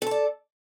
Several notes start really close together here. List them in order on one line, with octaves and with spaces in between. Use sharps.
A4 A5 D5